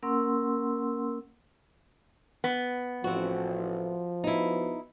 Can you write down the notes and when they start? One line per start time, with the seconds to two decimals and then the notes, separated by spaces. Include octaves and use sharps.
0.03 A#3 C#4 A#4 F#5 C6 E6
2.44 B3
3.04 A1 F3 C4 F#4
4.24 B3 D#4 E4 F#4 B4